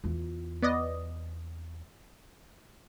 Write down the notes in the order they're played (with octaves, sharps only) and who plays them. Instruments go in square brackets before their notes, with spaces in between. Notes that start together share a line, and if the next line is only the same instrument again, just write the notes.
[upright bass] E2 F4
[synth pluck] B3 D5 D#5